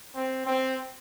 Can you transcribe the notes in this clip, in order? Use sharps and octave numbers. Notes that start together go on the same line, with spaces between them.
C4
C4